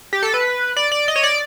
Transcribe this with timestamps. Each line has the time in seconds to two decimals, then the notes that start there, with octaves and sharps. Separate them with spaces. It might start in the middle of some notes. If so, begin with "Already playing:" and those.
0.13 G4
0.23 A4
0.34 B4
0.77 D5
0.92 D5
1.08 D#5
1.16 C#5
1.24 D5